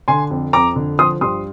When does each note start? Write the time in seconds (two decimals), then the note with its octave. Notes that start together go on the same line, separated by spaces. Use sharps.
0.08 D3 G#5 C6
0.30 F2
0.53 F2 A#5 D6
0.76 D3
0.99 F3 C6 D#6
1.21 G2 C6 D#6